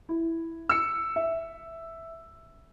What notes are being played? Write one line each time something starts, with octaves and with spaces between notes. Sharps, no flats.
E4
E6 C#7
E5